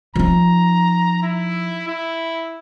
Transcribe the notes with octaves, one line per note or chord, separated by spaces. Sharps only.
F3 D#4 A#5
E4
E4